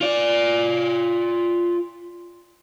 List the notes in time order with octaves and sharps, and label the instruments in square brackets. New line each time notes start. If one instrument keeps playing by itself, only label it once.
[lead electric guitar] F4 D5